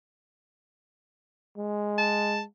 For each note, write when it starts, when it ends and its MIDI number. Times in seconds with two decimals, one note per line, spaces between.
1.57 2.44 56
1.98 2.40 81